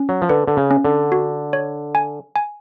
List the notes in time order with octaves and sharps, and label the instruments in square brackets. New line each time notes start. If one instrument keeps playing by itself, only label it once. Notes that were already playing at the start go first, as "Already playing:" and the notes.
Already playing: [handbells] C#4
[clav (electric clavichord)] F#3
F3
[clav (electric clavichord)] D3 [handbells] B4
[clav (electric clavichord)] D3
C#3
[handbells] C#4
[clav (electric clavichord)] D3
[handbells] F#4
C#5
G#5
G#5